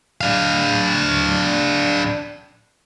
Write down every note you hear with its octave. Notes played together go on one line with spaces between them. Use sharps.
D4 F5